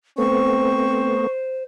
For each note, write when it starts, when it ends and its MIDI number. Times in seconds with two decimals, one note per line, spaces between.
0.18 1.27 57
0.18 1.27 59
0.18 1.16 60
0.18 1.63 72
0.18 1.27 85